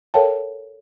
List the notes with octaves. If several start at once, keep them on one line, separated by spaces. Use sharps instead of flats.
A4 A#4 C#5 F5 G5 A5